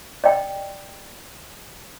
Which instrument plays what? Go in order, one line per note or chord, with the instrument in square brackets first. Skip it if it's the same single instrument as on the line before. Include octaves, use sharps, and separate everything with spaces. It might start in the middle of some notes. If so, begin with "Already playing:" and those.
[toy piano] D5 D#5 G5